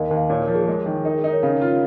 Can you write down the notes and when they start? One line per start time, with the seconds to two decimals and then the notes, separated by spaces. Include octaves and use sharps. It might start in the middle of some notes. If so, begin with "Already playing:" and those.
Already playing: D#2 A#4 D#5 F5
0.11 D#2
0.17 F5
0.30 A#2 C#5
0.42 A#4
0.48 F3
0.55 G#4
0.68 G#3
0.86 D#3
1.05 D#4 A#4
1.14 G#4
1.24 D#4 A#4
1.33 C#5
1.43 C#3 F5
1.61 F4